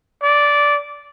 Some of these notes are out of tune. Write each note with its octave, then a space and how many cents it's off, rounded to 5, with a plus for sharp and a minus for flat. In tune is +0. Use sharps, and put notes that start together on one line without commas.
D5 -10